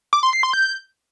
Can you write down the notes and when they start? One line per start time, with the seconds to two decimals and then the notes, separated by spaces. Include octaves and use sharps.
0.13 D6
0.23 C6
0.33 C7
0.43 C6
0.53 G6